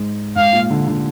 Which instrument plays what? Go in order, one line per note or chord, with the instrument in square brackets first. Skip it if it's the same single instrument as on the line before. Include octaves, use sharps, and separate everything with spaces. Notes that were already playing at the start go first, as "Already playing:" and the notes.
Already playing: [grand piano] G#2
[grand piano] G#2 [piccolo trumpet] F5
[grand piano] A#2
D3
D3